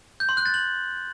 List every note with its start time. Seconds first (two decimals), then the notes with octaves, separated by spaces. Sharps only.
0.20 G6
0.29 C6
0.37 F#6
0.46 A6
0.54 F#7